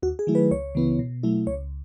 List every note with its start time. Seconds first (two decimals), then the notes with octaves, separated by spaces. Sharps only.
0.03 D#2 F#4
0.19 G#4
0.27 D#3 F#3 A3 E4
0.35 B4
0.51 C#2 C#5
0.75 C#3 E3 B3 E4
0.99 B2
1.23 F#3 A3 E4
1.47 C#2 C#5